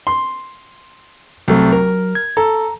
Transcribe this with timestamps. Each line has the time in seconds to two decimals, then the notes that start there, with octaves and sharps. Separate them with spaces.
0.07 C6
1.48 C2 F#3 A3
1.72 A#4
2.15 G#6
2.37 A4 A#5